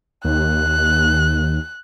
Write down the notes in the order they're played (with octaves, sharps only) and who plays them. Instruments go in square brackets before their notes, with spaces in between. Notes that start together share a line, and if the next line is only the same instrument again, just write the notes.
[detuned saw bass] D#2 [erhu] F#6